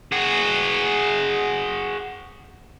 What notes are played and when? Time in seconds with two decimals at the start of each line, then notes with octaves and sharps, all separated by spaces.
0.12 F#4 G#4